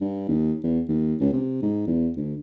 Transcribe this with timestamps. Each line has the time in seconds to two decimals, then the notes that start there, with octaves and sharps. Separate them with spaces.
0.01 G2
0.29 D#2
0.64 E2
0.89 D#2
1.20 C#2
1.33 C3
1.62 G#2
1.87 E2
2.16 D2